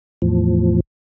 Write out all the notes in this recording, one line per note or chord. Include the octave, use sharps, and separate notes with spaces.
E2 A2 F3